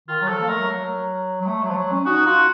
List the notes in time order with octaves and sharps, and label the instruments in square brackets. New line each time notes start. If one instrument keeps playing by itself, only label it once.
[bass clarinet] D#3 [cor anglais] F4
[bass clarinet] F#3
[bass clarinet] F3 [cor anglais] A4
[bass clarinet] A#3
[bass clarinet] A3 [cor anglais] A#4
[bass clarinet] F#3
F#3
A3
F#3
F3
F#3
C#4
[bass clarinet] D#4 [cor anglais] F#4
[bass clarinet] F4 [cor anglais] F#4